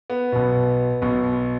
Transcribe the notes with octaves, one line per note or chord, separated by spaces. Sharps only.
B3
B1 B2
B1 B2